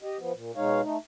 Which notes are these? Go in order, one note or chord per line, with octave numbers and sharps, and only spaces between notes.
G4 D#5
F3 B3
A#2
B2 G#3 D#4 C#5 F5
A3 D#4